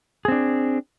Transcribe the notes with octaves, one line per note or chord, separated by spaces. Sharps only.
C4 D4 G#4